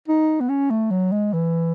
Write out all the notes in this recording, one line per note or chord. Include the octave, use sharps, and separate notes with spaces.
D#4
B3
C#4
A3
F#3
G#3
E3